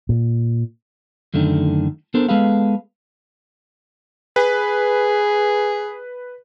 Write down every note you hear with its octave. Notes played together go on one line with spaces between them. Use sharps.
A#2
F#2 D3 D#3 A3
B3 D4 A4 A#4 C5
G#3 B3 G#4 A4 B4 F5
G#4 B4